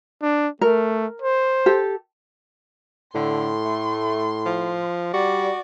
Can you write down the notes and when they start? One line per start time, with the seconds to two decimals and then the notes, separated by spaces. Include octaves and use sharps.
0.22 D4
0.61 A3 A#4
1.22 C5
1.66 G4 A4
3.15 A2 D3 C6
3.65 A3
4.46 F3
5.14 G3 F#4 D5